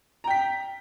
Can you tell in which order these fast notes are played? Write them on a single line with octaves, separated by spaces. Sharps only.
A#5 G5 B6